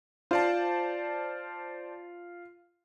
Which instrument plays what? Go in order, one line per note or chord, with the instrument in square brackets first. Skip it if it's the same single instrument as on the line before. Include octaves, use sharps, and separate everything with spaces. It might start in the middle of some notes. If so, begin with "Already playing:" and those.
[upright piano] F4 [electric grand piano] C5 D5 A5